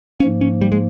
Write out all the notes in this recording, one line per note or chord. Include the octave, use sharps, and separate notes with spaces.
G#2 F3 A#3 C#4
C#4
G3
G#3